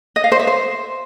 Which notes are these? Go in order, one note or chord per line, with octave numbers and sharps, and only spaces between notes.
D#5
F5
C5
E5
C5